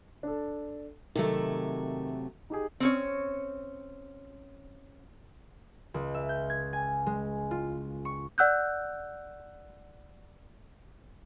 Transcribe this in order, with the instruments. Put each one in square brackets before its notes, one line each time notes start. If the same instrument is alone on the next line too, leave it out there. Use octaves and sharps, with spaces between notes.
[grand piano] D4 A4
[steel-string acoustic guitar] C3 F#3 A3 [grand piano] D#3
[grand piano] D#4 G4 G#4
[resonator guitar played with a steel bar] C4 C#4 C#5
[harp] C#2
E5
G6
G#6
G#5
G#3
F4
C#6
[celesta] D5 F#5 E6 F#6 G6